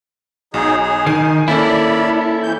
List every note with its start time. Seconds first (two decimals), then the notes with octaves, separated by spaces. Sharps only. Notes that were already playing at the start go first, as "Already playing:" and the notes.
0.54 B1 F#3 D#4 G#4
0.82 G#4
1.06 D#3 D#4 G#5 C7
1.48 A#3 C#4 E4 A4 D5 B5
2.43 F2 E3 G6